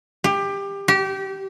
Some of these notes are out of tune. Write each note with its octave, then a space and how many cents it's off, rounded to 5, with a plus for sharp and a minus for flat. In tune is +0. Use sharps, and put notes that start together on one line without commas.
G4 +20
G4 -25